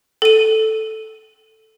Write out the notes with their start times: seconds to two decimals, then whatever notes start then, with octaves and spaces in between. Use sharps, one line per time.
0.22 A4 D#7